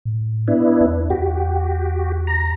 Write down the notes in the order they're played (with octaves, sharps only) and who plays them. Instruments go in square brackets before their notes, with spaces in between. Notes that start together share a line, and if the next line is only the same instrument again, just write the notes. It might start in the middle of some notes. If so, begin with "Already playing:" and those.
[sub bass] A2
[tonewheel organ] B3 D4 E4
[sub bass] E2
[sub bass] E2 [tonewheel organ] F#4 G4
[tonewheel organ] A#5